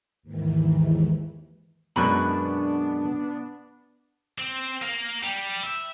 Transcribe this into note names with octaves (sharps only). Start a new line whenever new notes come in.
D#2 G#2 D#3 E3
F#2 B2 G#3 B3 D4 B5 C#6 F#6
C4
A#3
G3
E5